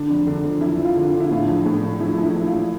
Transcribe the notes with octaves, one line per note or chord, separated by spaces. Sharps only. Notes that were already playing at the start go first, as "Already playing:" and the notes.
Already playing: D3 D4
F1
D3
F2
F2 E4
F3
F4
D3
F4
D3
E4
A2 F4
A#1
A2
A#1
A#1 E4
A#1
E4
A#1
F4
A#1